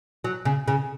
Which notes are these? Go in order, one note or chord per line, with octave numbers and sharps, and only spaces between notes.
F#3
C#3
C#3